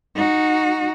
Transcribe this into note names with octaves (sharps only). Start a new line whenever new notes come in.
D#4 F#4